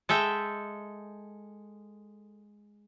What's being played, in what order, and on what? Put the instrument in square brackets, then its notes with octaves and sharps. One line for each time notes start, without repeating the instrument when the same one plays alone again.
[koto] G#3 A4 E5 G5